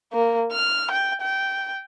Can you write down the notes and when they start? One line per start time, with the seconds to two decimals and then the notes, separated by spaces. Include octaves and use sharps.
0.13 A#3
0.52 F6
0.91 G5
1.21 G5